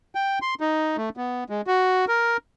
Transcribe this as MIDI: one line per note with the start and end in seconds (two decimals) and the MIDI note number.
0.15 0.39 79
0.42 0.55 84
0.61 0.97 63
0.97 1.09 57
1.17 1.44 59
1.50 1.61 56
1.67 2.05 66
2.08 2.37 70